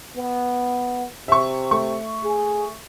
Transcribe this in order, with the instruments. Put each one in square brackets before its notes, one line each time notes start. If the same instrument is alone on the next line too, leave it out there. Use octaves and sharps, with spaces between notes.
[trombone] B3
[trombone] C3 [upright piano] E5 C#6
[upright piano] A3 C#6
[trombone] G#4